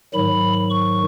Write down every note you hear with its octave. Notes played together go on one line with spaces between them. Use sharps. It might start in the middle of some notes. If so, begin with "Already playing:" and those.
G#2 D#3 F#3 B5
C#6